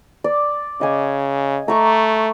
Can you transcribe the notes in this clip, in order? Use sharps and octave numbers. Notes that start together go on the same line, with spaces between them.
D5
C#3 D#5 G#5
A3 A#5 C#6 D6